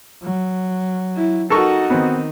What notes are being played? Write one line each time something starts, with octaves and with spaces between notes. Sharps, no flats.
F#3
E4
D#4 F#4 A4 A#4 C#6
D#3 B3 C4